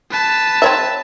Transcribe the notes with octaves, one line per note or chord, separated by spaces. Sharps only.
B4 A5
C4 C#5 E5